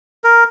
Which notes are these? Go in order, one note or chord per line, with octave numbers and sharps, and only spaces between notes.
A#4